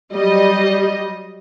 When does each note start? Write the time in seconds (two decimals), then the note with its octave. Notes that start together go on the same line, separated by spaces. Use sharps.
0.13 F#3 G3 D#5